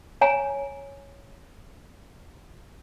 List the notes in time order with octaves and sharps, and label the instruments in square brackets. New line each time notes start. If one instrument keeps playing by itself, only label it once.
[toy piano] C#5 G#5 A#5